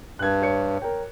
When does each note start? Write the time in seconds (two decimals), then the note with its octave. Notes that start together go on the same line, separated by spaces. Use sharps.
0.19 G2 F#6 G#6
0.42 C#5 G#6 C#7
0.82 A#4 C#5 G5